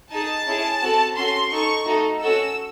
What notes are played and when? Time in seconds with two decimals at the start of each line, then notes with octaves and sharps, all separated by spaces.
0.11 D#4 G#4 A5
0.46 C#4 E4 G#4
0.81 C4 F#4 A4
1.16 C#4 F#4 A4 C6
1.51 D#4 A4 C#6
1.86 A3 D#4 F#4 A4
2.21 C#4 F#4 A4 E6